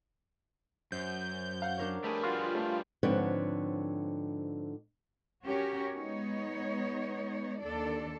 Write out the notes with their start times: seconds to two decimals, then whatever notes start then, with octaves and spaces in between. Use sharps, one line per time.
0.92 F#2 C5 G6
1.62 F5 F#5
1.77 D4 A#4 C#5
2.04 G3 A3 G#4 B4
2.23 F4 F#4
2.55 A3
3.03 G#2 D3 F3 C4 B4 C#5
5.45 C#4 F#4 G4 A#4 C#5
5.92 G#3 B3 D#4 C#5
7.61 D#2 D4 A4 D5